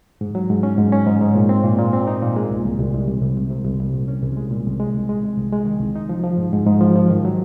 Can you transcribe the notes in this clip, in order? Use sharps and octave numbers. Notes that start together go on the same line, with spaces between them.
G#2
F#3
G#2
C#4
G#2
C#4
G#2
G#2
A#2
C4
A#2
A#2
C4
D#4
A#2
G#3
C2
C2
C2
C2
C2
C2
C2
C3
C2
C2
A#2
C#4
C2
G#3
A#2
C2
G#3
C2
G#3
C3
C2
G#3
D#3
C2
D#4
F3
F3
G#2
G#2
G#2
F3
F3
D#3
F#3